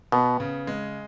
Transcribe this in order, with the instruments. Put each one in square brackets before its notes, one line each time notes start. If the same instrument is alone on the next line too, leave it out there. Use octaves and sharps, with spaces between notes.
[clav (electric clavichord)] B2 [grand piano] B3
[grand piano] C#3
G#3